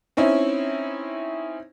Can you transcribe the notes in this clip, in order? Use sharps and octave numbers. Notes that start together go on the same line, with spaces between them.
C4 C#4 D#4 E4